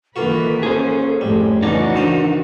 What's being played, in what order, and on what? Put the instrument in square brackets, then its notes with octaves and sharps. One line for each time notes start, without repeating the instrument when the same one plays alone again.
[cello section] D#3 E3 B4 [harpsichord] A#3 F4 F#4 [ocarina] A4
[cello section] C#4 [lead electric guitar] G#4 C5
[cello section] F2 A2 [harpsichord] G3
[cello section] C#3 E3 F#4 [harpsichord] B3 C#4 [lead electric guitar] D#4 D5
[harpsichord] D#3 C5 D#6 [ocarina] D4